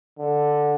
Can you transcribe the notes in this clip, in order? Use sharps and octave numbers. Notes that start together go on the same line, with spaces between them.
D3